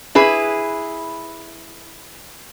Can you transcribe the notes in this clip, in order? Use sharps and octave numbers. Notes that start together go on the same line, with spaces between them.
E4 G#4 B4